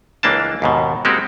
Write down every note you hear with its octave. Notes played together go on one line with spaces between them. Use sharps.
C#2 E3 A#3 D4 A5
D#2 G#2 B2
G#3 A#3 C4 F#4 G4